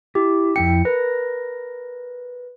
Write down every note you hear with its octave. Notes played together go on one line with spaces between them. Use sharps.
E4 G4
F2 E4 G5 C#7
A#4 B4